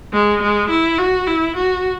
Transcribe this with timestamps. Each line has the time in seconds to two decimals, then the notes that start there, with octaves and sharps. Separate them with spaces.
0.13 G#3
0.43 G#3
0.70 E4
0.99 F#4
1.27 E4
1.57 F#4